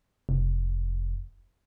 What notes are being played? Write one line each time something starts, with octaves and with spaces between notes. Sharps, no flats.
F1